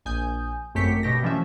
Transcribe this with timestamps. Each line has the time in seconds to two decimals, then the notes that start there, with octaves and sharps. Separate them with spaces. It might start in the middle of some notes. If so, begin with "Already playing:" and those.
0.05 A#1 G#5 D#6 G6
0.74 G#1 F#2 A3 G4 B6 C#7
1.03 G2 B2 G4 A#6
1.23 E3 F3 A3 C#4 E5